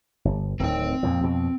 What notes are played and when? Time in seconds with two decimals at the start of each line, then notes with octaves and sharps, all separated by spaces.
0.25 G1
0.60 D1 D#3 C4 G5
1.03 F2 A#2 F3
1.21 F2 B2